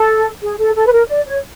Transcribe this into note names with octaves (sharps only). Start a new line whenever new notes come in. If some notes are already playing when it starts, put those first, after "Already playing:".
Already playing: A4
G#4
A4
A4
B4
A#4
D5
C#5